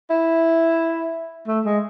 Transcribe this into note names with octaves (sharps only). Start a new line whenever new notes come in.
E4
A3
G#3